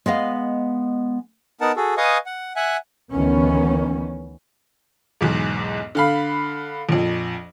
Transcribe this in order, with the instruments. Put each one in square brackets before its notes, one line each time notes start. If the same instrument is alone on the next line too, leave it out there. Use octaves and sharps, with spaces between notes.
[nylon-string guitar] G#3 B3 D#5 F5
[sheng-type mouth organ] B3 D#4 A#4 F#5 A5
F#4 G#4 A4
B4 D#5 F5 G#5 C#6 D#6
F#5
E5 F#5 G#5 F#6
[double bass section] D2 D#3 E3 B3 C#4
[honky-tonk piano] B1 E2 G#2
D3 F5 B5
A#1 F2